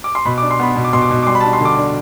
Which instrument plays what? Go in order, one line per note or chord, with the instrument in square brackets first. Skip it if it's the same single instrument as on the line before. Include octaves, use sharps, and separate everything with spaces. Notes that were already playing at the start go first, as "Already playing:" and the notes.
[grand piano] D6
C6
B2 B5
D6
D4
C6
B3 B5
B2
D6
B2 C6
D6
B2
D6
G3 C6
B5
A5
D4
C6
D3 D6
D4